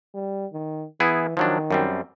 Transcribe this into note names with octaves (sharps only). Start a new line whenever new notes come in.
G3
D#3
E3 B3 E4 G#4
D#3 F3 F#3 D4
F#2 G3 C4